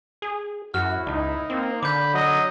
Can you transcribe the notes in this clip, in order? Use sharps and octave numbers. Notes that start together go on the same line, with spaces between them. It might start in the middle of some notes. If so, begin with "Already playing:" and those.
G#4
F#2 E4 F#4 F6
C#2 D#4
A#3 C4
D3 B5 D6 G6
F#3 D#5